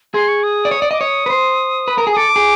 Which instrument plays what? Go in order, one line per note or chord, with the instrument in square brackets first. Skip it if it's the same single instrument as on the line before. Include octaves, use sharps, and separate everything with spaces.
[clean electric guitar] G#4 [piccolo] C6
[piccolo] C#6
D#6
[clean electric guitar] D5
C#5
D5
[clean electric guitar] D#5 [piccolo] D6
[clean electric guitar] C#5 [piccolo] D#6
[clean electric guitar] B4
C5
B4
A#4
G#4
[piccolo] D#6
[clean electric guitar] A4 [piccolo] D6
[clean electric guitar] G#4